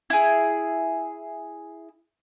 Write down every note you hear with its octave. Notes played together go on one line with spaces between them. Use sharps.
E4 G#4